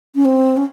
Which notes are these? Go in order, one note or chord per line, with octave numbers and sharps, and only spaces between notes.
C#4
C4
C#4